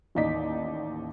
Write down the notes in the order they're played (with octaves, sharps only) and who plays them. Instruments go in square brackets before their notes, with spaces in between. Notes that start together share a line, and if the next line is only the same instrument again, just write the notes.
[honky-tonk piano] A1 D#2 D#4 D5 B6